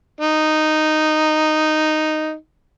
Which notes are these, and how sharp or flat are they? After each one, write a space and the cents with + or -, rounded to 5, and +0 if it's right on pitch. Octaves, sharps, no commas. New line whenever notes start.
D#4 -5